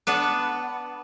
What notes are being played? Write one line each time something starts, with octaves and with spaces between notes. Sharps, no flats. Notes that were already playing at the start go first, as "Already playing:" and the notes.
B3 D4 B4